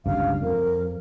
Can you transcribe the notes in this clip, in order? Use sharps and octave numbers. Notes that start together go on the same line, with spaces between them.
G1 C#2 G2 F5
F2 A#4